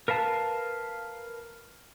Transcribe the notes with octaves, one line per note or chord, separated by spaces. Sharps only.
A#4 B4 F5 A5